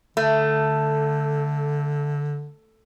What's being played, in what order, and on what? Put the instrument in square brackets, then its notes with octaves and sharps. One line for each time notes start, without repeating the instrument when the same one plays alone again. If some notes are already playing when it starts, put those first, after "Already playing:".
[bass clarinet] D3 [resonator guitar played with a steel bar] A3